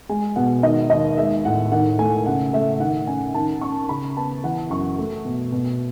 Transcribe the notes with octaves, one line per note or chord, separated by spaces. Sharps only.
G#3 G#5
B2 F#5
D#3 D#5
D#2 D#5
G#3 E5
A2 F#5
D#3 F#5
A3 G#5
C#3 F#5
A3 E5
D#3 F#5
C#4 G#5
D#3 A5
C#4 C#6
C#3 B5
B3 A5
E3 F#5
F#2 C#6
A3
B2
B2